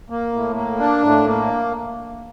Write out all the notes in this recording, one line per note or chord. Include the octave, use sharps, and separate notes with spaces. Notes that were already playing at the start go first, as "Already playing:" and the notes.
A#3
A2
A#3
D4
A2
A#3